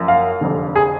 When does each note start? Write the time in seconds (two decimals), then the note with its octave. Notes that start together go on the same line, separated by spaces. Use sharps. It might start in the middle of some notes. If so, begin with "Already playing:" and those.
Already playing: F#1 F#2 F3
0.08 F5
0.41 F1 F2 D3
0.76 G#4